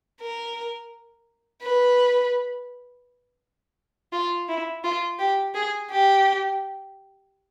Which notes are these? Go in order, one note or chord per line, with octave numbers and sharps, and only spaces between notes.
A#4
B4
F4
E4
F4
G4
G#4
G4